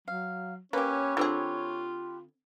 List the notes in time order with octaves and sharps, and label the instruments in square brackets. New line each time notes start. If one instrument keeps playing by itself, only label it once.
[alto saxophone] F#3 [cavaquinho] F5
[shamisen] A#3 [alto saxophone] C#4 [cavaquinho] G4 B4 [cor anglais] C#5
[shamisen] D3 C4 G#4 [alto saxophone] F4